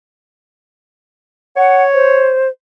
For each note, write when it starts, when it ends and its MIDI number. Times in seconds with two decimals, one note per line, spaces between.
1.57 2.36 73
1.57 1.83 78
1.94 2.48 72